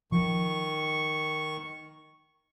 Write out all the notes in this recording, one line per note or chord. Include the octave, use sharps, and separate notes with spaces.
D#3 F3 C#6